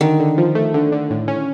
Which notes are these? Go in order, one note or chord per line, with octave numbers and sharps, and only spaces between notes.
D3 D#3
D3
F3
A3
D3
D3
A2
C#4